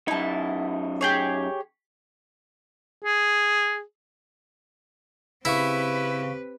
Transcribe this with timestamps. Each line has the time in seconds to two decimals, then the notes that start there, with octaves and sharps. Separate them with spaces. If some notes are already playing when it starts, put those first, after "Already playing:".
0.08 F#2 D#4 E4 A5
1.01 G4 G#4 C#5
3.04 G#4
5.45 C#3 C4 E4 G4 B4 F5 C#6